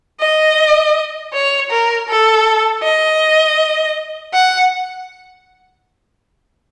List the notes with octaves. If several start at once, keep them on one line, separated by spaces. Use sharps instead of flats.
D#5
C#5
A#4
A4
D#5
F#5